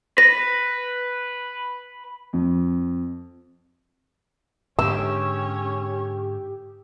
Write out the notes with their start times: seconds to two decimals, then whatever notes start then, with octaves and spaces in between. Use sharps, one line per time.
0.18 B4 A#6
2.33 F2
4.79 G#2 D3 C#4 G4 C#5 E6